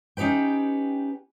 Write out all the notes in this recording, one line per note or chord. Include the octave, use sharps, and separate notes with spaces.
C#4 D#4 G4 B4 G5